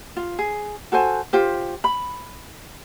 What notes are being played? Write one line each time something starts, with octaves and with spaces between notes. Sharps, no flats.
F4
G#4
F#4 A4 C5 G#5
F4 G4 C5
B5